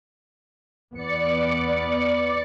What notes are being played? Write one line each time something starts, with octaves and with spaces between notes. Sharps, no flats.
E2 B3 D5 C#7